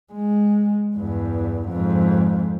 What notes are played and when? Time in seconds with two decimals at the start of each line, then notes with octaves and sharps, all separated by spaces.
0.13 G#3
0.96 E2 G2
1.69 F2 G#2